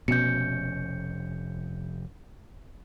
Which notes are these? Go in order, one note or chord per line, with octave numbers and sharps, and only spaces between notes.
F1 B2 C#4 G6 C#7